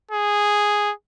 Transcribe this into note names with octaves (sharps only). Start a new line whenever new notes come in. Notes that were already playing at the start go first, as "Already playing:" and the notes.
G#4